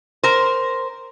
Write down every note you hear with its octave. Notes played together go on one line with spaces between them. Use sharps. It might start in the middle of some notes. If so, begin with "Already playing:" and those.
A#4 C5